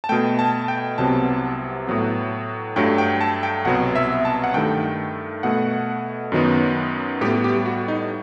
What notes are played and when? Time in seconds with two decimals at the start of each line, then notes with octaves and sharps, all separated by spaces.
0.04 A5
0.09 B2 A3 G5
0.39 A5
0.68 G5
0.98 C2 C3 F#3 B3 A5
1.87 A2 F#3 B3
2.76 G2 F#3 A3 G5
2.98 G5
3.21 A5
3.43 G5
3.65 C2 B2 F#3 B3 F#5
3.95 E5
4.25 A5
4.44 F#5
4.54 G2 D#3 A3 G5
5.43 B2 A3 F#5
6.32 F#2 D#3 F#3 B3
7.21 A2 G3 B3 G4
7.44 G4
7.66 F#4
7.88 D#4